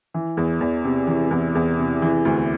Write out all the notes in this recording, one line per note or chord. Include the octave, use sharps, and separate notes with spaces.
E3
E2
E2
C3
E3
E2
E2
C3
E3
D2